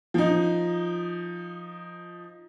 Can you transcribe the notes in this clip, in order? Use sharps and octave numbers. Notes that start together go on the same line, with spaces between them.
F3 D#4